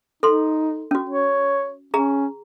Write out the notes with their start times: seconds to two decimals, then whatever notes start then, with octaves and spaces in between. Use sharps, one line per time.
0.23 D#4 A4 C6
0.91 C#4 F#4
1.10 C#5
1.94 C#4 G#4 A#5